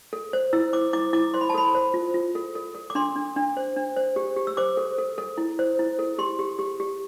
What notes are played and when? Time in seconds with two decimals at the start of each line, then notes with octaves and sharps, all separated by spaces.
0.13 A4
0.33 C5
0.53 E4 E6
0.73 C5 D6
0.93 E4 D6
1.13 E4 D6
1.34 C5 C6
1.41 B5
1.49 A5
1.54 A4 B5
1.75 C5
1.94 F4
2.14 F4
2.35 A4
2.55 A4
2.75 A4
2.90 D6
2.95 D4 C6
3.16 D4
3.36 D4
3.57 C5
3.76 D4
3.97 C5
4.16 G4
4.36 G4
4.47 E6
4.57 C5 D6
4.77 A4
4.98 A4
5.18 A4
5.38 E4
5.59 C5
5.79 E4
5.99 A4
6.18 G4 C6
6.39 G4
6.59 G4
6.80 G4